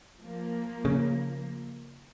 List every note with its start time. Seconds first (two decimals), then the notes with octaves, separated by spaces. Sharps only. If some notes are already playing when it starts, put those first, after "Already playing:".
0.18 F3 A#3
0.85 C#3